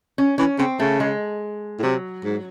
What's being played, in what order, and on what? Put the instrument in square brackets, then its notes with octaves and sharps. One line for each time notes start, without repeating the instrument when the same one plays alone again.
[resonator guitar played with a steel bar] C#4
[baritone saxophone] E3 [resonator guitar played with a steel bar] C#4
[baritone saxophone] C#3 [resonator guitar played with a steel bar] C4
[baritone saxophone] C#3 [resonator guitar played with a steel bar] A3
[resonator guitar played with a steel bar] G#3
[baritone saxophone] A2
[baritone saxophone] C3 [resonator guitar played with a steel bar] F#3
[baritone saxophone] G#2